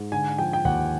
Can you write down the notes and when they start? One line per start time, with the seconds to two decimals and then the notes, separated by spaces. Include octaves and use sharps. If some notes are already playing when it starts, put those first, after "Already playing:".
Already playing: G#2
0.12 D3 G#5
0.38 F3 G5
0.53 G5
0.65 D#2 F#5